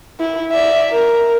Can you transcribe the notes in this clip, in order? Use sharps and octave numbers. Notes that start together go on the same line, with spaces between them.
E4
D5 E5
A#4